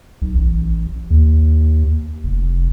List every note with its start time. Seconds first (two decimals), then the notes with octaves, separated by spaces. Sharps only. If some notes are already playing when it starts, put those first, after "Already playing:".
0.22 B1
0.36 A1
1.10 D#2
2.24 F1